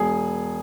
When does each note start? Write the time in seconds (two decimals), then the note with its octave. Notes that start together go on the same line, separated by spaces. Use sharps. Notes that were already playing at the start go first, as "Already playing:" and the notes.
Already playing: E1 G#4